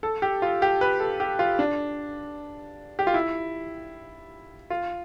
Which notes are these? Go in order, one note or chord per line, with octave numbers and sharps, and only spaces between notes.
A4
G4
F4
G4
B4
A4
G4
F4
D4
G4
F4
E4
F4